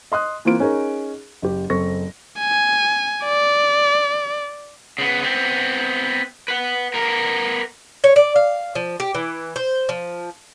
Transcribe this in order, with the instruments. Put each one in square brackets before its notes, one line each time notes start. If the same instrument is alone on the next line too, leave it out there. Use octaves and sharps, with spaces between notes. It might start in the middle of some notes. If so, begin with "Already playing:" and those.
[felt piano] D#5 C6 D#6 F#6
E3 A#3 C4 F4 D7
C#4 D#4 G#4 A#4 C#5
F#1 G4
F#1 C4 A4 C#6 A#6
[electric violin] G#5
D5
[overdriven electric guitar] C#3 B3
B3 C4
B4 F#5
B3 A#4
[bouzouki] C#5
D5
F5
F3
G4
E3
C5
F3